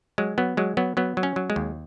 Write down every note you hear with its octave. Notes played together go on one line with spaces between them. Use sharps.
F#3 G#3
F#3 B3
F#3 G#3
F#3 B3
F#3 B3
F#3
C#4
F#3
G#3
D#2